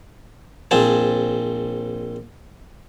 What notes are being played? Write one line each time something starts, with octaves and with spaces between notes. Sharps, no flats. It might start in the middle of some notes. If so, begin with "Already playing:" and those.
A#1 C4 G#4 A5